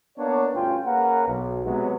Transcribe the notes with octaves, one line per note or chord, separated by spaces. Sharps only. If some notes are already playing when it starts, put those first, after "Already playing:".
A#3 B3 D4 C#5
D2 G2 C#4 F4 G5
A#3 C#4 G#4 A#4 B4 F#5
B1
C3 F#3 G#3 B3